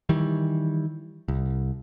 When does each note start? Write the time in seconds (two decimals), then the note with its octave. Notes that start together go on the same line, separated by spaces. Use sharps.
0.09 D#3 E3 G3
1.28 C2